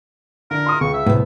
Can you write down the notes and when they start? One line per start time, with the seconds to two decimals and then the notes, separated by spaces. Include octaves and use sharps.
0.51 D3 A#4
0.66 C6 D#6
0.81 C#2 C#6
0.94 E5
1.06 C2 A2 B3